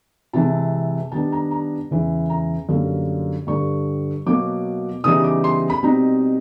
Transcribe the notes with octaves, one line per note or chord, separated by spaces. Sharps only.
C3 E3 G#3 C4 A5
D#3 G3 B3 D4 A5
A#5
A#5
E2 C#3 E3 G#3
A#5
F#2 D3 G3 A#3
G2 D3 G3 C#6
B2 F#3 A#3 D6
C#3 E3 G3 B3 D#4 D#6
D6
C6
B5
B2 G3 C4 D#4 A#5